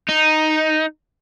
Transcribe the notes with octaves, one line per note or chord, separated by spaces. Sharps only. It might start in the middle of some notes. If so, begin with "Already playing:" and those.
D#4